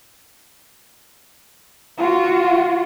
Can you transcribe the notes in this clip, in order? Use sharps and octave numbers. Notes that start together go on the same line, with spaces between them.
F4 F#4